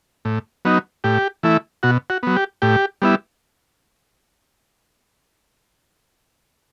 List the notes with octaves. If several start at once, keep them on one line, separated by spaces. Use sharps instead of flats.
A2
F#3 B3 D#4
A2 G4
E3 A3 E4
B2 F#4
F#4
F#3 B3
G4
A2 G4
G3 B3 E4